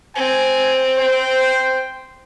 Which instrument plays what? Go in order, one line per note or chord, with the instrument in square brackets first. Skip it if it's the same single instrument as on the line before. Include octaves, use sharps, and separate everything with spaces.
[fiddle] C4 [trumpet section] G#5
[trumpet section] C5 G5